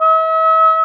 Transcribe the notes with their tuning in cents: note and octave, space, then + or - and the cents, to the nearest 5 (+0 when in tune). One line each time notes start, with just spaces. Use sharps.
E5 -40